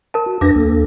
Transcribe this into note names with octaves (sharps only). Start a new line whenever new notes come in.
A#4 A5
F#4
F2 D4 B4 D6 A#6
D#2 A#3 A4